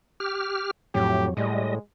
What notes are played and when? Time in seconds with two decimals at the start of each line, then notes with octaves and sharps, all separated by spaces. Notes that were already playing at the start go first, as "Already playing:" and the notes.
0.20 G4 F6
0.95 F2 A2 F#3 G4
1.37 A2 G3 G#3 D#5